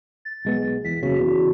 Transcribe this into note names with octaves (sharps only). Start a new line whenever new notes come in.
A6
B1 G#3 B3
E2 B6
F#1 C#3 F#4
E2 C#3